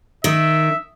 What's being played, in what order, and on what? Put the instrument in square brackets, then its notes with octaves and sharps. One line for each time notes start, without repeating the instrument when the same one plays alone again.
[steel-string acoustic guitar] D#3 [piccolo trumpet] E5